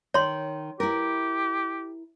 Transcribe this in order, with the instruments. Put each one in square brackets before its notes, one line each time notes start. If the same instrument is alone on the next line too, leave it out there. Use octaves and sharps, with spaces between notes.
[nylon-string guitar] D#3 [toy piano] C#5 C6
[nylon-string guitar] E4 A#4 [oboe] G4